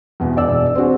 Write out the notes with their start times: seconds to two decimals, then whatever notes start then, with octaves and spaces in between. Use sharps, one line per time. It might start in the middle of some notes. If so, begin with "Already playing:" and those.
0.20 E2 B2 E3
0.37 E1 D5 E6
0.75 C4 D4 F#4 G#4